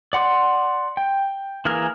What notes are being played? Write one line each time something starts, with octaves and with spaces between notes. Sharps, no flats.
D5 F#5 C6 D6
G5
E3 A#3 G#4 A#4 F6